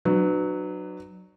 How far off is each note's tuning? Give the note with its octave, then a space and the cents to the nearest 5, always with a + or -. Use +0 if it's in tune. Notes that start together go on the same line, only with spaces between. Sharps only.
F#3 +0 D4 +35 B4 +15